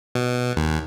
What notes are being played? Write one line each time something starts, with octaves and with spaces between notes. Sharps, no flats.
B2
D#2